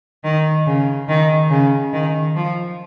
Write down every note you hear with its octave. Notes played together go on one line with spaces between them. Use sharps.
D#3
C#3
D#3
C#3
D#3
F3